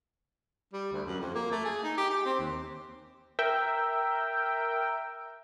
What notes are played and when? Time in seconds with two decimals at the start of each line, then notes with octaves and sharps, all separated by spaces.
0.73 G3
0.92 D2
1.06 F#2
1.20 F2
1.34 A#3
1.51 A3
1.65 G#4
1.84 D#4
1.98 G4
2.10 G4
2.25 C4
2.39 D#2
3.39 A#4 E5 G5